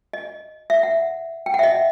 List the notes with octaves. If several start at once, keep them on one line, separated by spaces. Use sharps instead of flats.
D#5
E5
F#5
G5
F#5
E5
D#5